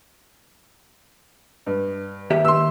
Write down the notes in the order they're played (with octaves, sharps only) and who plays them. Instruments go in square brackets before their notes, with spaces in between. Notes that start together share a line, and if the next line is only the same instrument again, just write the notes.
[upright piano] G2
[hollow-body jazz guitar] D#2 G4 E5
[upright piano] C6 E6